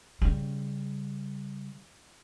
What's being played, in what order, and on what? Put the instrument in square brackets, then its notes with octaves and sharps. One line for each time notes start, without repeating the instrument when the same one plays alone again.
[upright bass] C#3 G3